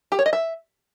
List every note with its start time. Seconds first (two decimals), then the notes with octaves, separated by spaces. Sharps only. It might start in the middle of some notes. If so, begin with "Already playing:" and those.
0.12 G4
0.19 C#5
0.26 D#5
0.33 E5